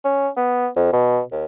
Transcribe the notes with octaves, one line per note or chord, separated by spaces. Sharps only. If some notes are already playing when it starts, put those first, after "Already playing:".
C#4
B3
F2
B2
D#2